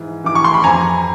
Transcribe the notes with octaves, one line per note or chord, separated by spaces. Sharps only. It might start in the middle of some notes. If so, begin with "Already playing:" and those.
Already playing: G#2 E3
E3 D6
C#6
C6
B5
F2 G#5 A#5